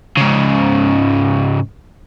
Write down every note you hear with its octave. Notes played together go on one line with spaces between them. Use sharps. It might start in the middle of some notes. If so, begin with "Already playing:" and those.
G#2 C#3